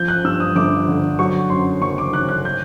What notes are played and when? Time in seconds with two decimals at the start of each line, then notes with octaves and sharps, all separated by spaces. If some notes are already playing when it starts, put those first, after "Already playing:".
Already playing: F3 G6
0.08 F#6
0.24 G2 E6
0.40 D#6
0.56 G1 D6
0.88 D3
1.19 F#3 C#6
1.50 F#2 C6
1.81 F#1 C#6
1.98 D6
2.13 D#3 F#6
2.29 F#6
2.45 G6